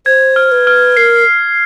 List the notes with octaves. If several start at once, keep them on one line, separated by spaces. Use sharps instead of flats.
C5 G#6
F6
B4
F6
A#4 C7